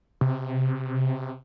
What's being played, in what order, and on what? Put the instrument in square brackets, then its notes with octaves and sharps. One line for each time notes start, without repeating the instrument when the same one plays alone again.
[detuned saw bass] C3